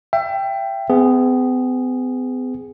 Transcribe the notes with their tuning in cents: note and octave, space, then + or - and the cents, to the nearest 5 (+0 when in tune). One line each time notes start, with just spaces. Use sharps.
E5 +30 G5 +0
B3 +45 G#4 -10